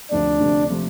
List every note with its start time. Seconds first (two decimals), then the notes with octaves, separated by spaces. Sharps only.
0.11 D2 C3 F3 A3 D4
0.40 D2 C3 F3 A3
0.70 C3 F3 A3